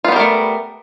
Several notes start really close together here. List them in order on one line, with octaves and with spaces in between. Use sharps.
F4 B3 G3 A#4 A3